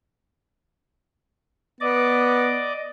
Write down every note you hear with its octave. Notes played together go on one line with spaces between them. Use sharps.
B3 D5 D#5 D6